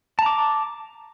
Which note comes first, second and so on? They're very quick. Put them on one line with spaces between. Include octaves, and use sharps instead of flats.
A5 A#5 D6